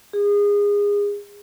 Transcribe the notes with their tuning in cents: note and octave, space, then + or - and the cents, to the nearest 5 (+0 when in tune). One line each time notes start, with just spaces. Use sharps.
G#4 -25